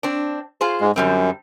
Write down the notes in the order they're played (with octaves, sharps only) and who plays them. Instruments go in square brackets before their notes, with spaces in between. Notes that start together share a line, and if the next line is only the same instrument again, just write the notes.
[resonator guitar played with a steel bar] C4 D4
F4 G#4 C5
[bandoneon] G#2 G#3
[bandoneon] F#2 [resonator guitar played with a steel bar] D3 G3 C4